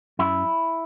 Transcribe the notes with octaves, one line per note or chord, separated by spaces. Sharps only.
F#2 E4